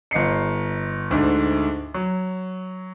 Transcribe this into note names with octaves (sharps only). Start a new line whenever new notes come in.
G1 D#5 C7 C#7
D2 G#2 D3
F#3